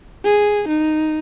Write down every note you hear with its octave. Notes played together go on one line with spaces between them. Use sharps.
G#4
D#4